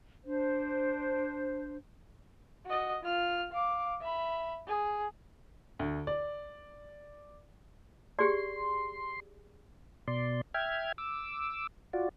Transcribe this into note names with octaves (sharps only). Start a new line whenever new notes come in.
D4 C5
F#4 D#5
F4 F6
F5 D6
E5 B5
G#4
D2
D5
G4 G#4 D5 C6
B2 D5 C6
E5 G5 F6 G#6
D6 E6
F4 F#4 D5